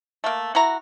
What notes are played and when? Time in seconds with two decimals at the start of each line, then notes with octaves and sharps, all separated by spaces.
0.24 A3 A#3
0.55 E4 F#4 A#5